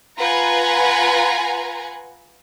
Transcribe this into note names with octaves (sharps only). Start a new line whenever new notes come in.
F4 B4 F#5 G#5 A#5